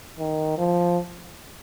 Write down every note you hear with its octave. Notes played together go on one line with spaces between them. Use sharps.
D#3
F3